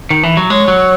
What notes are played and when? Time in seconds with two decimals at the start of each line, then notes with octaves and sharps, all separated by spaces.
0.11 D#3
0.23 E3
0.37 F#3
0.50 G#3 C#5
0.68 F#3